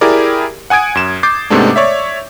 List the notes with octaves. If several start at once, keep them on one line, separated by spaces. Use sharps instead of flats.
E4 G4 G#4 A#4 D5
F#5 G#5 D#6 G#6 D7
F#2 E7
D6 G6 A6 C7
G#2 C3 G#3 A3 B3 D4
C#5 D5 E5